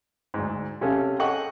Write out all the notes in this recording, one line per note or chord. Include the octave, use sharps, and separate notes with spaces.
D2 G#2
C3 C#4 G#4 A4 F5
G#4 A4 D#5 F#5 G5 C#6